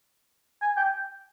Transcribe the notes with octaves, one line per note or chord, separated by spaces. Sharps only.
G#5
G5